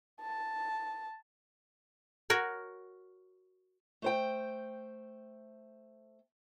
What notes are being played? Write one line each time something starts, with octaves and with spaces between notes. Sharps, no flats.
A5
F#4 A#4 C#5
A3 C5 G5